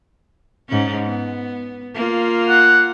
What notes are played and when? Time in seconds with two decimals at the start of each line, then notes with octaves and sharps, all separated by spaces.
0.69 G#2 C#4
1.05 B3
1.94 A#3 F4
2.49 F#5